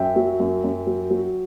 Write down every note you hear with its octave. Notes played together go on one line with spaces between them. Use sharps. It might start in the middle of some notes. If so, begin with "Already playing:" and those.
Already playing: F#2 E5 G5
F#3
F#2
F#2
F#3
F#3